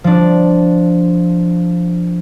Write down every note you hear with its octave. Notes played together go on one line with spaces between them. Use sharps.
F3 D4